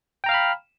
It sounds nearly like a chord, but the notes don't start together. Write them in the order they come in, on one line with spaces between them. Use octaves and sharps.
G5 A#5 F5 F6 B5